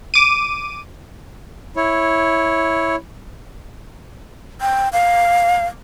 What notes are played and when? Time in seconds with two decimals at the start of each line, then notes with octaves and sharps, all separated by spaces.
0.14 D6 D#7
1.76 E4 C#5
4.61 G5
4.93 F5